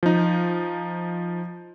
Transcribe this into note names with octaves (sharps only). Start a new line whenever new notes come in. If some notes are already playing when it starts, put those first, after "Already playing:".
F3 D#4